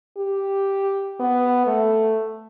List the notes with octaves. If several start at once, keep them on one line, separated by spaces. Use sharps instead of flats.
G4
B3
A3